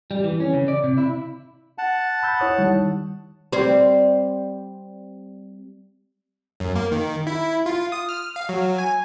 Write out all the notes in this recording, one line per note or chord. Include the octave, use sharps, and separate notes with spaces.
G3
E3
C#4
C#3
D5
C3
E4
F#5 A5
B5 E6 G6
E4 C#5 D#6
D#3 G3
G3 C4
F#2
A#3
D#3
E4
F4
D#6
F6
F5
F#3
G#5